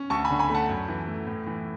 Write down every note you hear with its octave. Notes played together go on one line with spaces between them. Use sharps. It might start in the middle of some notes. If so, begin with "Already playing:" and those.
Already playing: C#4
D2 A5 C#6
G#5 B5
D3
G#5 B5
A3 F#5 A5
F#2
E3
A3
A2
E3